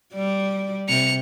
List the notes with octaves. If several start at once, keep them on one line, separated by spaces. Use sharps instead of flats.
G3 D5
C3 C#7 F7